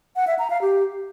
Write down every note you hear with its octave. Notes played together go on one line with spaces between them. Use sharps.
F#5
E5
A#5
F5
G4